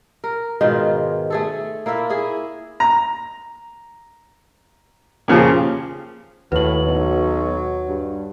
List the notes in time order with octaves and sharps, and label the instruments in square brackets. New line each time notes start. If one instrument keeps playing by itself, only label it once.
[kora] A#4
G#2 B2 D#3 F4
A3 G#4 A4
A#3 E4 F4 E5
E4 G#4
[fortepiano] A#5
A#2 C#3 F3 G4 G#4
[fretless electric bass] D#2 [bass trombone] A2 [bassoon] F#3 [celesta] B4 F#7
[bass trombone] B1
G2